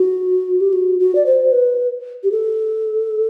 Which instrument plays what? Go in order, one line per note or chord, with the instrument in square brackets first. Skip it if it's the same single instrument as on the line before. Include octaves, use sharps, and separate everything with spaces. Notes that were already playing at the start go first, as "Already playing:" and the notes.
Already playing: [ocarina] F#4
G4
F#4
F#4
D5
C5
B4
G4
A4